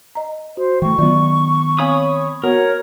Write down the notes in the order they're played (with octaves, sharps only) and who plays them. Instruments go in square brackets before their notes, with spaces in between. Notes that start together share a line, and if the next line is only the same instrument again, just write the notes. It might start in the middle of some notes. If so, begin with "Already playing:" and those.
[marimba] D#5 A#5
[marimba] F#4 [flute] C5
[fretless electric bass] E3 A3 [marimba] G5 [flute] C#6
[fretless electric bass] D#3 B3 [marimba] F#3 F4 D5
[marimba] C4 F5 G#5 [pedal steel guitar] C#5 B5 D#6
[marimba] B3 F#4 F#5 [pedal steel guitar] A#4 [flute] C#5